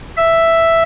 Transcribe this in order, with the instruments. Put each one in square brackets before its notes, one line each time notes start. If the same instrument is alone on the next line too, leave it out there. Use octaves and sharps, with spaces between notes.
[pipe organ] E5